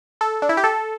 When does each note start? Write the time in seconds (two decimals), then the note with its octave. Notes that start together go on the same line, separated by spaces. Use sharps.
0.21 A4
0.42 D4
0.49 E4
0.57 G4
0.64 A4